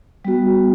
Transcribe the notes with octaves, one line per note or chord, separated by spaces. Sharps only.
G3 B3 F#4